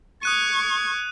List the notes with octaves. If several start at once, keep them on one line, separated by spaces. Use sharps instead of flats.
C#6 D#6 F#6 G#6 D#7